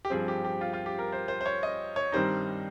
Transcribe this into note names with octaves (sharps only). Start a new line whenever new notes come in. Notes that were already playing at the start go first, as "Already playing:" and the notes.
G4
G2 F3 C4 G#4
G4
G4
F4
F4
G4
A#4
C5
C5
C5
C#5
D#5
C#5
G2 D#3 G3 C4 D#4 C5